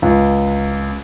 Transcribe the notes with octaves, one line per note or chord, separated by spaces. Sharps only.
C#2